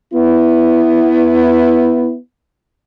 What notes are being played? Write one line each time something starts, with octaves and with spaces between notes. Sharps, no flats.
B3 E4